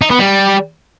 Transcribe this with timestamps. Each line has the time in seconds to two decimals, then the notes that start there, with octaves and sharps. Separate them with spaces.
0.02 D#4
0.10 B3
0.19 G3